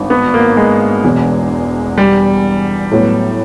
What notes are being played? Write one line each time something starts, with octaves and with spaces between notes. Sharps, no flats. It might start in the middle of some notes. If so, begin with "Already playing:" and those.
Already playing: G#1 G2
B3
A#3
G#3
E1 E2 B2
G3
A2 F#3 B3